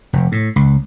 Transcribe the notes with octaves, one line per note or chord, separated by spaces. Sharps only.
F1
A2
C#2